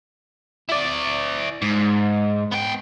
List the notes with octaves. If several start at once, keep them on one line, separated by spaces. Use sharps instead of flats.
E4 D5
G#2
B3 G5